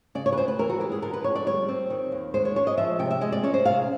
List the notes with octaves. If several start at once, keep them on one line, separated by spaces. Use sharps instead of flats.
C#3 D5
C#5
B4
D2 C5
B4
E3 A#4
F#4
G#3 G4
G#4
D3 A#4
B4
F2 C#5
D5
G3 C#5
C4
D#3
D#2
G#3 C5
C#5
C#4 C#5
D#5
F3 E5
C3 G5
E5
G#3 D#5
D5
C#4 C#5
C5
C3 F5